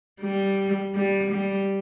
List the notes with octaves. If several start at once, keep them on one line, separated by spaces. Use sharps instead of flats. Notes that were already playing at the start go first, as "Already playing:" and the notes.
G3
G3
G3